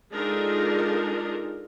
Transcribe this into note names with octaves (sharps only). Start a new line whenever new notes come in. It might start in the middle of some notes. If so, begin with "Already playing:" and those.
G#3 D4 D#4 F4 A4 A#4